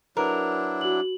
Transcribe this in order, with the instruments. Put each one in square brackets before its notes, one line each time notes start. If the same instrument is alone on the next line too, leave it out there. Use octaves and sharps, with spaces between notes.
[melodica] F#3 D4 E4 [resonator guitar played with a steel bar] A#4 [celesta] B4
[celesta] F#4 F#7